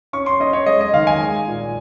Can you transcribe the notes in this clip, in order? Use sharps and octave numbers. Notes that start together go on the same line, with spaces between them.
C#4 C#6
C6
C#4 D#5
C#5
G#3 D#5
D#5
D#3 F5
G#5
G#3
A#2